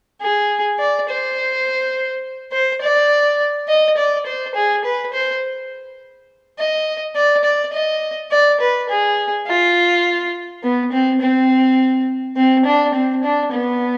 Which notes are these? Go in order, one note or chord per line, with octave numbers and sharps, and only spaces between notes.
G#4
D5
C5
C5
D5
D#5
D5
C5
G#4
B4
C5
D#5
D5
D5
D#5
D5
B4
G#4
F4
B3
C4
C4
C4
D4
C4
D4
B3